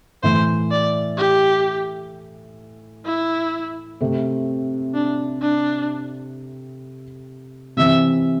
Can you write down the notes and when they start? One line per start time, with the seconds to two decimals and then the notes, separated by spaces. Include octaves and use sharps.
0.23 A2 E3 A3 C5
0.71 D5
1.17 G4
3.06 E4
4.01 C3 A3 C4
4.94 D4
5.42 D4
7.77 C3 E3 C4 E5